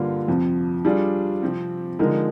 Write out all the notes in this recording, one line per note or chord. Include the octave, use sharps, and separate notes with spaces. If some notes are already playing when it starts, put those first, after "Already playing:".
Already playing: G2 D3 G3 A#3 F4
F2 C3 F3
G3 D4 F4 G#4
C3 F3 C4
D3 F3 G#3 D#4 A#4